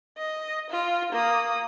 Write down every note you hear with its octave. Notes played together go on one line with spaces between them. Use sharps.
D#5
F4
A#3 D#6